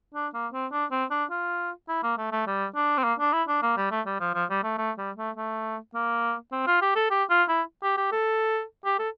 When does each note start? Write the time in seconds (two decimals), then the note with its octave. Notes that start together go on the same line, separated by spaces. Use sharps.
0.14 D4
0.34 A#3
0.53 C4
0.71 D4
0.91 C4
1.10 D4
1.30 F4
1.88 E4
2.03 A#3
2.17 A3
2.32 A3
2.46 G3
2.75 D4
2.97 C4
3.04 A#3
3.19 D4
3.33 E4
3.48 D4
3.62 A#3
3.77 G3
3.91 A3
4.06 G3
4.20 F3
4.35 F3
4.50 G3
4.63 A3
4.78 A3
4.98 G3
5.17 A3
5.36 A3
5.94 A#3
6.52 C4
6.67 F4
6.81 G4
6.96 A4
7.10 G4
7.29 F4
7.48 E4
7.82 G4
7.97 G4
8.12 A4
8.85 G4
8.99 A4